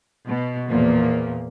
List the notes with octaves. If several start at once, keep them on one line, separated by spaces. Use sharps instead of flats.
B2
E2 A#2 F3 A#3